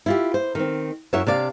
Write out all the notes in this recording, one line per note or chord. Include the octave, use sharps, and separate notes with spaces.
E4 F4 G4
C5
D#3 C4
F#2 F#3 E4 C#5 E5
C3 D4 D5 F5